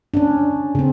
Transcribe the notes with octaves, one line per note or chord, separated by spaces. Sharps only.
C#4 D4
C#3 C4